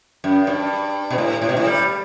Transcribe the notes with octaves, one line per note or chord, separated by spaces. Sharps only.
F#2
G2
B2
A2
A2
B2
A2
G3